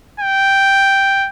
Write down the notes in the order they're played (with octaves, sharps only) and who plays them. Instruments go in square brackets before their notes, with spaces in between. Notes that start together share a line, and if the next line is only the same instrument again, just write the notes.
[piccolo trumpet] G5